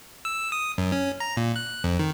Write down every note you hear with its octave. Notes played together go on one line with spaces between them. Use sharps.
E6
D#6
F#2
C#4
A#5
A#2
F#6
F2
D#3